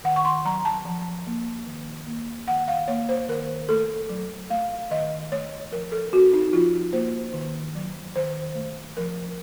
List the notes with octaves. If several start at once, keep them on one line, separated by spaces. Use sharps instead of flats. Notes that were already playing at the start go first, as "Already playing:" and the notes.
D#3 F#5
C#6
C6
F#3 A#5
A5
F3
A#3
D#3
A#3
D#3 F#5
F5
A#3 C#5
C5
D#3 A#4
A3 A4
F#3
A3 F5
D#3 D#5
A3 C#5
F3 A#4
A4
C4 F#4
D#4
F3 F4
A#3 C5
D#3
F#3
D#3 C5
A3
F3 A#4